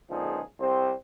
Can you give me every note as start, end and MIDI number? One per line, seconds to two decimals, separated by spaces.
0.10 0.41 37
0.10 0.41 46
0.10 0.41 50
0.10 0.41 53
0.10 0.41 63
0.10 0.41 68
0.60 0.92 36
0.60 0.92 60
0.60 0.92 67
0.60 0.92 72